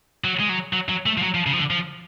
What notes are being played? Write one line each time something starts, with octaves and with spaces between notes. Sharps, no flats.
F#3
G#3
F#3
F#3
F#3
A3
F3
F#3
F3
C#3
F3
D3
F3